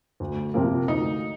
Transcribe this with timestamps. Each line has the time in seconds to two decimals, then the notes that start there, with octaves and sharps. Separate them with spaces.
0.20 D2
0.54 C3 F3 A#3
0.87 D2 D#4